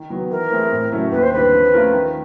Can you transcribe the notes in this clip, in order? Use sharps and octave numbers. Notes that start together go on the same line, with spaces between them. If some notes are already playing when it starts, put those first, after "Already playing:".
Already playing: D#3
F#3 B3
E3 A#4
A3 C4 E4 G#4
A2
F#3 A3 C#4 E4
D#2 B4
C5
D3 G3 C4 B4
F3
A3 C#4 F4 A#4
D#3